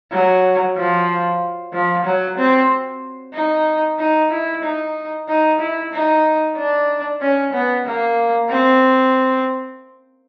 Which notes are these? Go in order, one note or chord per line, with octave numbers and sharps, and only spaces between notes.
F#3
F3
F3
F#3
C4
D#4
D#4
E4
D#4
D#4
E4
D#4
D4
C#4
B3
A#3
C4